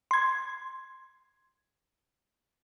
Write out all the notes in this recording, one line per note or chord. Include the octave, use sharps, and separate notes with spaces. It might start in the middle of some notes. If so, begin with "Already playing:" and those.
C6 G#6